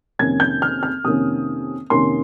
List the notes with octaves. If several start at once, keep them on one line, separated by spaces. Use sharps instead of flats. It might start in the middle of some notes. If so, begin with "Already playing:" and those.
F2 C3 D#3 A#3 C#4 G#6
G6
F6
F6
F2 C3 D#3 A#3 C#4 D#6
F2 C3 D#3 A#3 C#4 C6